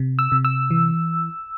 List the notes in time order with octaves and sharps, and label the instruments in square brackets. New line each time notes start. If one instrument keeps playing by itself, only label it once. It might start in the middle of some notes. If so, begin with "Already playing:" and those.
Already playing: [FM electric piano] C3
E6
C3
E6
E3